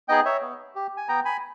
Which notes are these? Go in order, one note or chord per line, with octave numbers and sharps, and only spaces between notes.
B3 D#4 G#4 D#5 G5
C#5 E5
B3
G4
G#5
B3 G5 A#5
G#5 B5